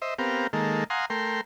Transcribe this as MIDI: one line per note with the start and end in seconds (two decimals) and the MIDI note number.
0.02 0.14 72
0.02 0.14 75
0.02 0.14 76
0.19 0.47 59
0.19 0.47 60
0.19 0.47 67
0.19 0.47 70
0.19 0.47 77
0.53 0.84 51
0.53 0.84 56
0.53 0.84 58
0.53 0.84 69
0.90 1.05 77
0.90 1.05 78
0.90 1.05 80
0.90 1.05 82
0.90 1.05 84
0.90 1.05 87
1.10 1.41 57
1.10 1.41 70
1.10 1.41 79
1.10 1.41 84